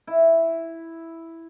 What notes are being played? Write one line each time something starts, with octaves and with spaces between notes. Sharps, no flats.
E4